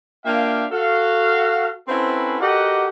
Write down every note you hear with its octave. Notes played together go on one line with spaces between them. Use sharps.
A#3 D4 F4 E5 F5 G5
F#4 A4 F5
C4 C#4 E4 F#4 A4 B4
F#4 G4 A4 A#4 D#5 F#5